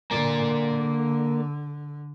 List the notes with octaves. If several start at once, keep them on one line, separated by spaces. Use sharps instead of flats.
D3 A#3 D5